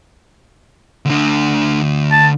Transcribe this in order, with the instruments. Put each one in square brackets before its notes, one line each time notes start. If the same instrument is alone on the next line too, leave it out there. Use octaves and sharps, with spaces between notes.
[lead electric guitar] D2 D3
[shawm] A5